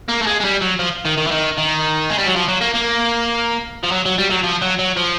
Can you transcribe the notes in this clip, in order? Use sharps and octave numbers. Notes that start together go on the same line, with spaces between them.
A#3
A3
G#3
G#3
G3
F#3
F3
D#3
D#3
E3
D#3
D#3
G#3
G3
F#3
F3
F#3
A#3
A#3
F3
F#3
F#3
G3
F#3
F3
F#3
F#3
F3